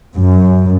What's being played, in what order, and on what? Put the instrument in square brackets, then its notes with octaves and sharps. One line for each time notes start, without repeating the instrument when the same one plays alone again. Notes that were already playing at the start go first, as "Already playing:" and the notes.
[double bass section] F#2